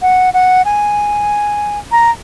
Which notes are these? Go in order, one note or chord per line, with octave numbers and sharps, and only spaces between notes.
F#5
F#5
G#5
A#5